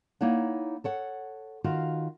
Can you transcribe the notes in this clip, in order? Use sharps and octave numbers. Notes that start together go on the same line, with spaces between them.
A#3 D#4 E4 C#5 D5 F#5
A4 C#5 F#5
D#3 F4 F#4 F5